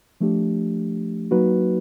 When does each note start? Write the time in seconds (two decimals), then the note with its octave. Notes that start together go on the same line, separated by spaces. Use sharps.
0.21 F3 A3 D4 G4
1.31 F#3 A#3 D#4 F#4 B4